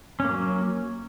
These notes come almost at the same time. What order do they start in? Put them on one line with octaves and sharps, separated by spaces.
C#4 A#3 F#3